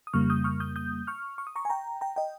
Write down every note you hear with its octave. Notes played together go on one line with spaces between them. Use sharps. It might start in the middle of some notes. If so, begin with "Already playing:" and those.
D#6
F2 C#3 G3 A#3 C#6 F6
D#6 G6
C#6 F6
D#6 G6
D#6 G6
C#6 F6
C#6
D#6
A#5 C#6
G#5
G5 A#5
G5 A#5
D#5 G5